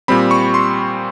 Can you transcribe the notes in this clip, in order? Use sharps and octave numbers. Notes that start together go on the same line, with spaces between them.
A#2 G3 C4 B5
C#6
C6